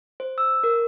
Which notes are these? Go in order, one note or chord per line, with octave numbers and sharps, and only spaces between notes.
C5
E6
A#4